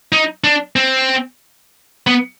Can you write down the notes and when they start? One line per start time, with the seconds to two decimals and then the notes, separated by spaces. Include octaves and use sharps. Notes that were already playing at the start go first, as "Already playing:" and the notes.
0.12 D#4
0.44 D4
0.76 C4
2.07 B3